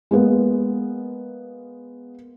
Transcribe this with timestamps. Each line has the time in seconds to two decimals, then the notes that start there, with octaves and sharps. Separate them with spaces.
0.11 G#3 A#3 B3